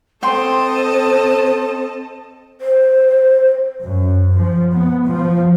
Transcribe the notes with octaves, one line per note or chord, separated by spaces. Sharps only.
C4 A4 D#5 G5 A5 C6
C5
F#2
F3
B3
F3